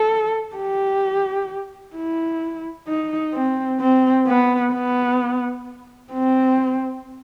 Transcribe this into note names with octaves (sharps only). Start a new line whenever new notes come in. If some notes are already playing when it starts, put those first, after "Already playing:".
Already playing: A4
G4
E4
D#4
C4
C4
B3
B3
C4